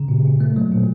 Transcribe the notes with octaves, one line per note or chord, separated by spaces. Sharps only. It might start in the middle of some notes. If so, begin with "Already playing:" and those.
Already playing: C#3
A#2
A#2
A3
F#3
A#2